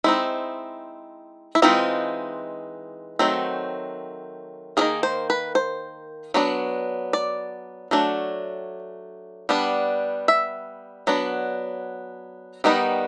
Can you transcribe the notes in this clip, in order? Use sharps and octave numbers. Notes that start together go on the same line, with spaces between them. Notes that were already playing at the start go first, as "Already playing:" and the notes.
G#3 C4 D#4 E4
E4
E3 G#3 C4 D#4 F4
D#3 F#3 A3 C4
D#3 F#3 A#3 G#4
C5
B4
C5
F#3 B3 D4
D5
F#3 A3 D4
G3 B3 D4
E5
F#3 B3 D4
D#3 G3 B3 D#4